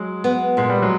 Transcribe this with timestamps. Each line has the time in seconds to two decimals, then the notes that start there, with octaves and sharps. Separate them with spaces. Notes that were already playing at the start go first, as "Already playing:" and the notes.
Already playing: F#3 G#3
0.24 B3
0.57 A#2 G#3
0.70 G3
0.82 F#3 G#3